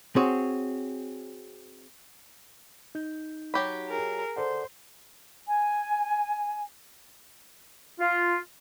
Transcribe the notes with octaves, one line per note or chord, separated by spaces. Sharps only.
C4 F#4 G#4 C#5
D#4 G6
F#3 G4 B5
G#4 A#4
A4 C5 D5 F#5
G#5
F4